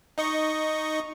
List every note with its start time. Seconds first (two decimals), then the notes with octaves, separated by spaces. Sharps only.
0.18 D#4 D#5 C#6